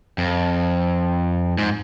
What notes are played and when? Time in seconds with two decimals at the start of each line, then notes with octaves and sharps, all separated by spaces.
0.18 F2
1.58 G#2